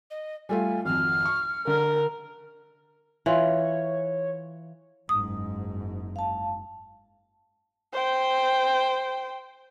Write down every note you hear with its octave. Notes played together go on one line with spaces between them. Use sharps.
D#5
G3 A3 F4 G#5
G#1 F2 F6
C#6
D3 A#4
E3 F4 C#5
F#1 G#2 D#6
F5 A5
C5 G5